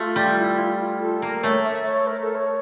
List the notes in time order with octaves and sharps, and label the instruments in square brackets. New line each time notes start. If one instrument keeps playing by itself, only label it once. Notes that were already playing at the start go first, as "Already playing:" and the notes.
Already playing: [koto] A3 [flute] F4
[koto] G3
[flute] E4
F4
F4
A4
[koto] A#3 [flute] A#4
[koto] A3 [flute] C#5
[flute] E5
C#5
A#4
A4
C#5